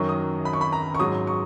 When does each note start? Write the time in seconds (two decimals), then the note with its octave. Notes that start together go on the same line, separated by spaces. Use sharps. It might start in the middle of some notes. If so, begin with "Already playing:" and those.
Already playing: F#2 D#3 F#3 C#6
0.09 D#6
0.45 B5
0.53 C#6
0.61 B5
0.72 A#5
0.95 C#6
0.99 G#2 F#3 D#6
1.27 C#6